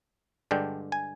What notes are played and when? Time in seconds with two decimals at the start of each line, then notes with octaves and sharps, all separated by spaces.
0.51 G2 D3 G#3 D4 G5
0.92 G#5